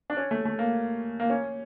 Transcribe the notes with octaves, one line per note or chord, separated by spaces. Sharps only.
D4
C#4
A3
A3
A#3
A#3
C#4